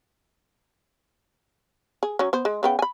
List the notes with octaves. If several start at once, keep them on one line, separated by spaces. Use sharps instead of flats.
G#4
F#3 C#4
B3 C5
G#3
C#3 B3 G5
G#5 B5